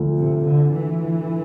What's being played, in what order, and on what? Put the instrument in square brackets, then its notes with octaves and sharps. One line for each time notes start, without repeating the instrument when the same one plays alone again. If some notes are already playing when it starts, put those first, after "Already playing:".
Already playing: [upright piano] D2 D3 F3 A3
[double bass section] C3
D3
E3